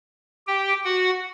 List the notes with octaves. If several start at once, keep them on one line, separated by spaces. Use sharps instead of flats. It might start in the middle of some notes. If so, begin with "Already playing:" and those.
G4 G5
F#4 F#5